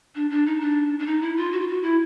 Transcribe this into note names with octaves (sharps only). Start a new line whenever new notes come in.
D4
D4
D#4
D4
D4
D#4
E4
F4
F#4
F4
F#4
E4